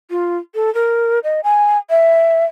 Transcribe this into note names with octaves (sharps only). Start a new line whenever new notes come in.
F4
A4
A#4
D#5
G#5
E5